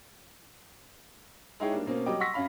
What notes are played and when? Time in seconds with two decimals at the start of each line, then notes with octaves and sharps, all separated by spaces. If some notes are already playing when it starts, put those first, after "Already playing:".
1.60 G#3 D#4 E4 G#4 C#5 G5
1.72 G3 A#3 D4
1.86 B2 A#3 C4 C#4
2.06 F#3 G3 D#5 G5 D6
2.20 F#5 C6 C#6 E6 A#6 B6
2.34 F#2 C#4 F5 B5